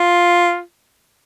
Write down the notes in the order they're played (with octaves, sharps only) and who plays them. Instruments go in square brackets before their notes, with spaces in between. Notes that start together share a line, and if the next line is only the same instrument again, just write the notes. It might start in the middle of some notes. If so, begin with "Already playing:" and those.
Already playing: [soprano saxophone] F4